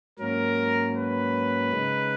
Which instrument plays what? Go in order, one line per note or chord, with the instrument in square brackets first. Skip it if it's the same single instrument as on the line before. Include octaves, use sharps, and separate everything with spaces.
[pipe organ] G#2 F#3 A#3 C#4 [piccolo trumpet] A#4
[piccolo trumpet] B4
[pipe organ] C#3 G#3 D#4